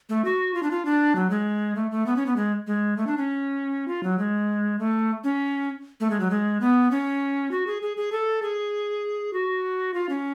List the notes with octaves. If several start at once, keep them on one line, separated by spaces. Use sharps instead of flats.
A3
F#4
F4
D4
F4
D4
F#3
G#3
A3
A3
B3
C#4
B3
G#3
G#3
A3
D4
C#4
F4
F#3
G#3
A3
C#4
A3
G#3
F#3
G#3
B3
C#4
F#4
G#4
G#4
G#4
A4
G#4
F#4
F4
C#4